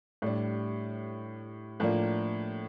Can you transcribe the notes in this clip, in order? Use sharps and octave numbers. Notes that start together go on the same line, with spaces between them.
A2 G3 D4
A2 F3 A#3 D4